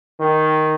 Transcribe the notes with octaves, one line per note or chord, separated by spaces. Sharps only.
D#3